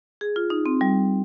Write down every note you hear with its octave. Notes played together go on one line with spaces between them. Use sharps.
G#4
F4
D#4
C4
G3